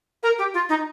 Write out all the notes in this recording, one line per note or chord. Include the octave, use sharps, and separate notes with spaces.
A#4
G4
F4
D#4